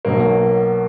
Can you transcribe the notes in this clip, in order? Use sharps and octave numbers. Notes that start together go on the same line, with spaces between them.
B1 B2 F#3 A#3